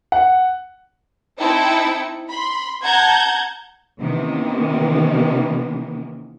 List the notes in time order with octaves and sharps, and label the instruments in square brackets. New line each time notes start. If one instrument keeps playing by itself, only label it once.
[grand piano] F#5
[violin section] C4 D#4 E4 G5 A5 C#7
B5 C6
F#5 A5 A#5 G6 G#6
[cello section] C3 D#3 E3 A#3 B3 C#4